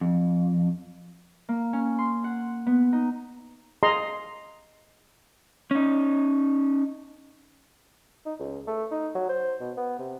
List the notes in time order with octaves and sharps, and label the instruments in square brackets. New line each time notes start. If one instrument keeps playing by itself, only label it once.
[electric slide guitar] F2
[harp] A#3
C#4
C6
F#5
B3
D#4
[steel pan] G#4 D#5 A#5 C6
[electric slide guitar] C#4 D#4
[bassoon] D#4
C#2
A3
D#4
F#3
C5
B2
B3
C3